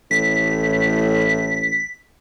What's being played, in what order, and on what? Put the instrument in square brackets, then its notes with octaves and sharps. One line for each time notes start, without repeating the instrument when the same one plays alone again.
[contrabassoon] A1 [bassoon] A2 [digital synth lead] B6